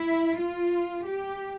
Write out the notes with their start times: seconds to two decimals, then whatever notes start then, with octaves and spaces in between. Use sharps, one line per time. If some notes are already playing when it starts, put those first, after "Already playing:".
Already playing: E4
0.38 F4
1.06 G4